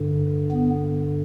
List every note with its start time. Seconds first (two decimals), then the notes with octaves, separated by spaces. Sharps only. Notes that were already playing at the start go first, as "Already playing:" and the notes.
Already playing: G2 D3
0.51 B3